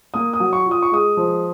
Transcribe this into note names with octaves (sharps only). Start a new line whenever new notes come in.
A#3 D#6
D#6
F#3
C#6
F4
D#6
C#6
G#3 D#6
F3